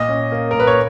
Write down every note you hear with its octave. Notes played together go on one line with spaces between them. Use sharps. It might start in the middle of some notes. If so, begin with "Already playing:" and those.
Already playing: A#2 D#5
C#4
A#3
A#2 A#4
B4
C#5